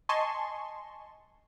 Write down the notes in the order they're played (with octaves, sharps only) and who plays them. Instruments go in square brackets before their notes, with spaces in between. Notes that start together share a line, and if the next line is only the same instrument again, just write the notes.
[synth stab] D#5 G#5 A5 C6 C#6